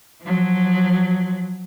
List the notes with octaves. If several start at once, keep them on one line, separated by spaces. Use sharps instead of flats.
F3 F#3